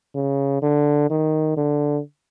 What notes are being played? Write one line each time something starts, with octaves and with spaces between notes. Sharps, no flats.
C#3
D3
D#3
D3